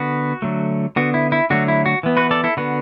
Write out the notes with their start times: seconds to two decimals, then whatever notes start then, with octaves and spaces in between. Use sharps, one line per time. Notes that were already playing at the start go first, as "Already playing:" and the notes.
Already playing: D3 B3 F#4
0.42 D3 F#3 A3
0.96 D3 B3 F#4
1.14 E4
1.32 E4
1.50 D3 F#3 A3 F#4
1.68 E4
1.86 F#4
2.03 E3 B3
2.17 F#4 B4
2.31 A4 D5
2.44 E4 A4
2.57 D3 B3 F#4 B4